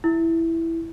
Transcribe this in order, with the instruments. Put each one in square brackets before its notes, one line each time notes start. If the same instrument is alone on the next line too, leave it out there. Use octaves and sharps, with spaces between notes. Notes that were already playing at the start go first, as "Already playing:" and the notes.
[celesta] E4